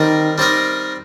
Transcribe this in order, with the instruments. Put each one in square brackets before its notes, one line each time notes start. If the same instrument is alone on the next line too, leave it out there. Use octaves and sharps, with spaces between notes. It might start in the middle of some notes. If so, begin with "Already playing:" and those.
Already playing: [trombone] D#3 [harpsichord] G3 C4 D#4 A#4
[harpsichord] G3 C4 D#4 A#4